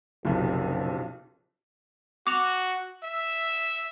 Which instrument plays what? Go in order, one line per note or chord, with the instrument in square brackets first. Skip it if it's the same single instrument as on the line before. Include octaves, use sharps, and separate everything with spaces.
[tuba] F#1 [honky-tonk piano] B1 C3 F3
[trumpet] F#4 [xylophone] D6 F7
[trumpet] E5